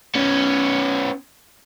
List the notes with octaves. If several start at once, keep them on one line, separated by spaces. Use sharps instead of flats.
B3 C#4